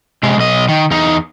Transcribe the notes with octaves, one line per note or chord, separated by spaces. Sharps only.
C3 G#3
B1 D#5
D#3
E2 D#4